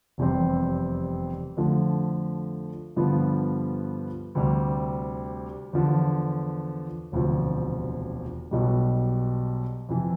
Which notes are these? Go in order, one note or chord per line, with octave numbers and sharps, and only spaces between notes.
F1 E2 C3 G3 C4
F2 D3 F3 A3
G2 D3 F3 B3 F4
D2 C3 G3
E2 D3 F3
E1 D2 C3 F3
B1 B2 G3
F2 C3 E3